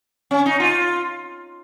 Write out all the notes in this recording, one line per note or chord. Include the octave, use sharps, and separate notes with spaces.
C#4
D#4
F4